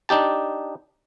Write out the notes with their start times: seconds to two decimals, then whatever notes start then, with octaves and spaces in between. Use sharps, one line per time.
0.09 D4 D#4 G4 A5